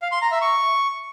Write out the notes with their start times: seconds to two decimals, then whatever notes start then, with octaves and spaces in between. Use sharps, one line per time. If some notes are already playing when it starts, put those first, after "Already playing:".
0.02 F5
0.12 C6
0.22 A#5
0.31 E5
0.41 C#6